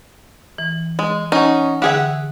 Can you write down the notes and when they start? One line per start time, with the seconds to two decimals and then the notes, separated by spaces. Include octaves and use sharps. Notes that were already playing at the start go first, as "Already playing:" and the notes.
0.58 E3
0.99 G#3
1.32 C#4 D#4 F#5 G#5 C#6
1.82 D3 G4 G#4 E5 F#5